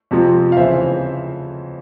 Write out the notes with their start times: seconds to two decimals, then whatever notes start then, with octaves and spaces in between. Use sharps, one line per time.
0.11 F2 C3 F3
0.52 F5
0.57 F2 C#3 E3 C5 E5